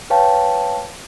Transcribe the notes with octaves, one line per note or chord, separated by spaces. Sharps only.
B4 C#5 F5 G5 A5